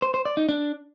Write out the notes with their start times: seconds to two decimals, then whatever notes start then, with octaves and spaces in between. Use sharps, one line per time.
0.02 C5
0.14 C5
0.25 D5
0.37 D#4
0.49 D4